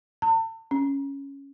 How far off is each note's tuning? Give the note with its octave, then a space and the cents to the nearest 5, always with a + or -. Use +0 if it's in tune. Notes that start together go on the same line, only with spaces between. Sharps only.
A5 +40
C#4 +0